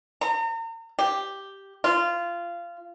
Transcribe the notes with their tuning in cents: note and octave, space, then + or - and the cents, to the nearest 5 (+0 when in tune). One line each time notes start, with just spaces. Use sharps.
A#5 -40
G4 +0
F4 -20